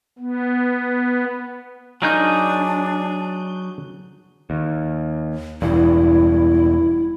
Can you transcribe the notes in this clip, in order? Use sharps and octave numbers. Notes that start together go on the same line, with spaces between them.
B3
F#3 D4 D#4 G#4 A#4 F5 G6
D#2
E1 E2 G2 E4